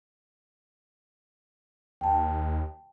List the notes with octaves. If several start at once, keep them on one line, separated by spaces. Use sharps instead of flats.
D#2 G5 A5